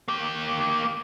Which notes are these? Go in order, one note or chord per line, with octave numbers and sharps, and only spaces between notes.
A#3 G4